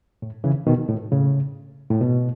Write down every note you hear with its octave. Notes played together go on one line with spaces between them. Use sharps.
A2
C#3 E3
B2 D#3
A2
A2 C#3
A2
B2